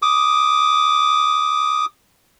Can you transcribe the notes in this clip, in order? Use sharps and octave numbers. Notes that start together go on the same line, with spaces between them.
D6 D#6